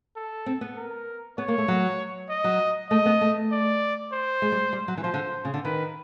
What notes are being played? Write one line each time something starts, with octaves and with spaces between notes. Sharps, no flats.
A4
C4
B3
A#4
B3 C#5
A#3
A3
F#3
D#5
F#3
A3 D#5
B3
A3
D5
C5
G#3
G3
G3
F#3
E3
F3 C5
D3
C#3
D3
D#3 B4